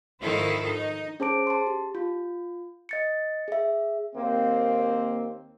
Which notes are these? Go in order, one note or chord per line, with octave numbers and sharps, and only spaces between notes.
G#2 D#3 F3 E4 A4 C5
D#4
C#4 G#4 C5 A5 D6 D7
A5 C6
G4
F4
D#5 A6 C#7
G#4 E5
D#2 A#3 C4